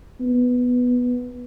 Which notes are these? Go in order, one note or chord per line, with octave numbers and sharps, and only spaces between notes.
B3